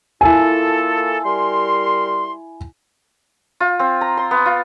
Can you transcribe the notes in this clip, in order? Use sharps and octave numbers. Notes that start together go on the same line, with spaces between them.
A#3 E4 F4 A4 G#5
G3 A#4 C6
F4
C4
A#5
C6
B3
F4